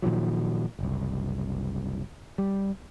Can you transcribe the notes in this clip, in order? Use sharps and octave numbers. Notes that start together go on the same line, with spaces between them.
A#2 D#3 F3 F#3
F#1 C2
G3